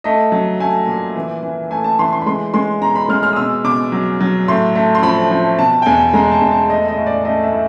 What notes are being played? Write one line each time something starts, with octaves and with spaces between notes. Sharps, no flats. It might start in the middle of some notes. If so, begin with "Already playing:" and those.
A3 D#5
F#3
A3 G#5
A#2
E3
E3
A3 G#5
A5
E3 C6
C6
B5
G#3 C6
G#3 C6
B2 A#5
B5
G#3 F6
F6
D#6
B2 E6
B2 D6
F#3
F#3
A2 C6
A3
C6
F3 B5
F3
B2 A5
G5
E2 G#5
G#3 A#5
A5
E2
A5
A3 D#5
D#5
A2
D5
A3 D#5
E5
A2